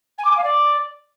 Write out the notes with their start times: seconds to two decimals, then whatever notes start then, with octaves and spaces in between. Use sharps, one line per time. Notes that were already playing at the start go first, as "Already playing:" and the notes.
0.18 G#5
0.24 D6
0.31 G#5
0.37 F5
0.43 D5